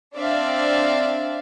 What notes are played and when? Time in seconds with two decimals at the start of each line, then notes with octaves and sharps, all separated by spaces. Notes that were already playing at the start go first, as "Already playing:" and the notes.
0.16 C4 D4 D5 E5 F5